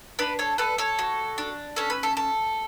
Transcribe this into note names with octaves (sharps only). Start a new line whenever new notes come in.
D4 B4 D5
A4 C#5
A4 B4 D5
A4 C#5
F#4
D4
C#4 A4
B4
A4
A4